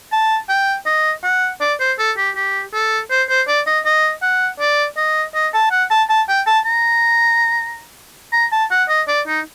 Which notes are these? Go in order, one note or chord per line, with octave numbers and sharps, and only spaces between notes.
A5
G5
D#5
F#5
D5
C5
A4
G4
G4
A4
C5
C5
D5
D#5
D#5
F#5
D5
D#5
D#5
A5
F#5
A5
A5
G5
A5
A#5
A#5
A5
F#5
D#5
D5
D#4